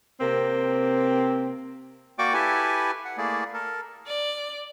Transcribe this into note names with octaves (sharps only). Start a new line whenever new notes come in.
C3 A#3 C4
A#3 F#4 D5 G5 C#6 D6
E4 G4 A4 B4 G#5
F#5
A3 A#3 E4 G#4 D5
A4 A#4
D5